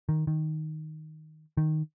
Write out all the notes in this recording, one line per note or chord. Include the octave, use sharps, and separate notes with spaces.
D#3
D#3
D#3